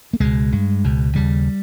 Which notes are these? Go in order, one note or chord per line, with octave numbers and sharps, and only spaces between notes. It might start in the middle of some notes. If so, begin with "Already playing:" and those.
A#3
C#2 B2 G#3
G2
C#2 B2
D#2 C#3 G3